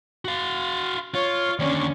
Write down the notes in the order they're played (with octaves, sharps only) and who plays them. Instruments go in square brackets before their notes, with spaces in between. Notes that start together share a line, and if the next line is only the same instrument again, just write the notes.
[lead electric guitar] F#4 F5
[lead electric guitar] F4 [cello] C#5
[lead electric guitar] D#2 D3 [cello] C#4 D5